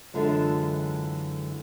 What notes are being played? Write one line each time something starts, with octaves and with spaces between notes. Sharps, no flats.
F#2 D3 E3 G#3 F4 A4